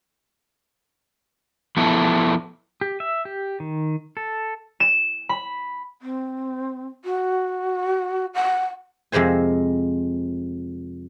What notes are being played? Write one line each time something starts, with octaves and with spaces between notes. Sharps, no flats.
F3 B3 E4 A4
G4
E5
G4
D#3
A4
E7
B5
C4
F#4
F#5
F2 C3 G#3 C5 G#5